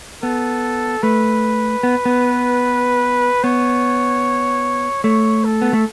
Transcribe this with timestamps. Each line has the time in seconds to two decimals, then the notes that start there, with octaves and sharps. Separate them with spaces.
0.23 B3 A4
1.03 A3 B4
1.83 B3
2.06 B3
3.44 B3 C#5
5.04 A3 C#5
5.45 A4
5.62 B3
5.73 A3